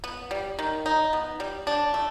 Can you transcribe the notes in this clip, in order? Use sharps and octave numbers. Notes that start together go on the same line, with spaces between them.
B3
G3
D#3
D#4
B3
G3
D4
A3